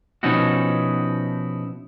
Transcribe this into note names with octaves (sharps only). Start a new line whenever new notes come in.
B2 F3 C#4 D#4 E4 F#4